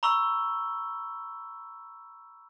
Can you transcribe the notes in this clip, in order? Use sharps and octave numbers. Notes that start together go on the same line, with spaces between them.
A#5 B5 C#6 E6 G7